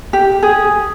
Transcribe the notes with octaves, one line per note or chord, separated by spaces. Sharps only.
G4
G#4